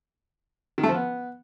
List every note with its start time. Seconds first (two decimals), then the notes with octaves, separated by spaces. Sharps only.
0.78 D#3
0.83 A3
0.89 F3
0.94 B3